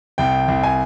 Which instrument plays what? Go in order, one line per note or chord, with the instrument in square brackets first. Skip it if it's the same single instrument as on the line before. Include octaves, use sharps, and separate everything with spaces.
[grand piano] C2 G5
C2
G#5